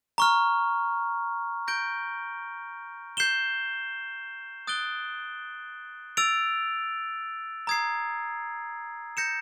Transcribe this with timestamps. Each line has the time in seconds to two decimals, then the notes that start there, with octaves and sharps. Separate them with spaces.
0.18 A#5 C#6 F6
1.68 G6 A#6 D7 G7
3.17 G6 C7 E7 G7
4.67 D#6 F#6 A6 D7 G7
6.17 E6 A6 D7 F7
7.67 A#5 D#6 G#6 C7
9.17 G6 A#6 C#7 E7